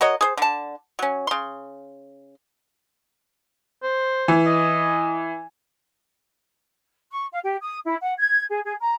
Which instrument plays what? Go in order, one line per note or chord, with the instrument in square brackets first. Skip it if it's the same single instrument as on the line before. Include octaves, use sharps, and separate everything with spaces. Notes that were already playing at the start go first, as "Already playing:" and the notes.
[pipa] F#4 A#4 C#5 D#5
G#4 C5
D3 A5
F#3 C#4
C#3 C6
[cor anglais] C5
[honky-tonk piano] E3
[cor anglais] D#5
[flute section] C#6
F5
G4
D#6
E4
F#5
G#6
G#4
G#4
A#5